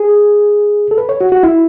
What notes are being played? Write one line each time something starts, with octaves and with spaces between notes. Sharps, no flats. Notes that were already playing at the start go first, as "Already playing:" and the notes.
Already playing: G#4
A4
B4
C#5
F#4
F#4
E4